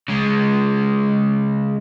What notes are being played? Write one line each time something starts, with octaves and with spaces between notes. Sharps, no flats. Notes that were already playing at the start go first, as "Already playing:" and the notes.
C#3 G#3